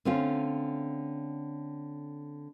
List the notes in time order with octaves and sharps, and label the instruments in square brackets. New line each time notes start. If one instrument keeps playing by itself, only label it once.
[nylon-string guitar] D3 A3 C4 C#4 F4